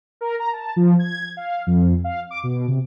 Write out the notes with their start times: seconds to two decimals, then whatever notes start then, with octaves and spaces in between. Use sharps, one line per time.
0.21 A#4
0.39 A#5
0.53 A5
0.76 F3
0.99 G#6
1.37 F5
1.67 F2
2.04 F5
2.31 D6
2.43 B2
2.68 C3